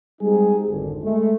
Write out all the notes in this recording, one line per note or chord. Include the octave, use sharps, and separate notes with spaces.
G3 G#3 C4 D#4 G#4
G#1 F2 D3
G#3 A3